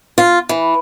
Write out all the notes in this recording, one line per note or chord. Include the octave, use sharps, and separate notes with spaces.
F4
E3